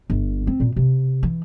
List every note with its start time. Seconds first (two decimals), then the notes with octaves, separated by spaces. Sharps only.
0.10 G1
0.47 C4
0.60 A#2
0.76 C3
1.23 E3